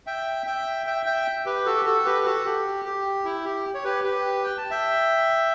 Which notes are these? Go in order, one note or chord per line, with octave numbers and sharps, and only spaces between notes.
E5 G5
E5 G5
E5 G5
E5 G5
G4 B4
F#4 A4
G4
F#4 A4
G4 B4
F#4 A4
G4
G4
E4
G4
C#5
G4 B4
G4 B4
G5
A5
E5 G5